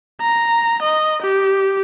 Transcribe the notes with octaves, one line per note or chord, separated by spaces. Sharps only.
A#5
D#5
G4